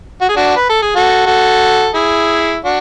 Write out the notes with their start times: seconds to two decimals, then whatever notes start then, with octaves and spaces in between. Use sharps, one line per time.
0.21 F#4
0.29 G#4
0.36 D4 F#4
0.56 B4
0.69 A4
0.82 G#4
0.96 F#4 A4
1.26 F#4 A4
1.95 E4 G#4
2.64 D4 F#4